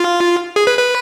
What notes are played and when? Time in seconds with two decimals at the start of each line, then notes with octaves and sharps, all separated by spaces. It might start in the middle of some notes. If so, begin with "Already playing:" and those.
Already playing: F4
0.56 G#4
0.67 B4
0.79 B4